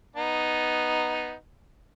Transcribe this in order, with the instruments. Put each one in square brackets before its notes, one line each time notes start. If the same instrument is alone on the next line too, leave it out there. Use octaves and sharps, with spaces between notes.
[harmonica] B3 D#4